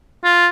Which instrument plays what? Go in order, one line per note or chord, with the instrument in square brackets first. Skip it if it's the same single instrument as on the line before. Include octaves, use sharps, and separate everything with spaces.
[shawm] F4